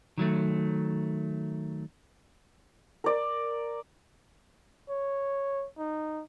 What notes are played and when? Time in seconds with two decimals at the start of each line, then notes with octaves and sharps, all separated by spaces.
0.18 D#3 F#3 A3
3.04 A#4 D5
4.89 C#5
5.78 D#4